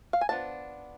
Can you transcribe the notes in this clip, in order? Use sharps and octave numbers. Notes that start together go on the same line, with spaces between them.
F5
G#5
F3 B3 D4 A5